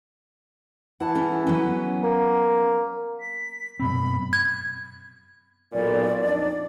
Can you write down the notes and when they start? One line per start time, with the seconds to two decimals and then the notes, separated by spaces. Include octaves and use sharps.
1.00 E3 F#5 A5
1.15 C#4 E4 A4
1.47 F#3 B3 C#4
2.03 A#3
3.20 B6
3.80 F#2 B2 C4 B5
4.33 G#6
5.73 B1 A#2 D5
6.21 F2 D4 D#4